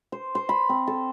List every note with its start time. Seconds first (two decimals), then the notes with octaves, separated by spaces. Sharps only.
0.12 C5
0.35 C5
0.49 B5
0.69 C4
0.87 A4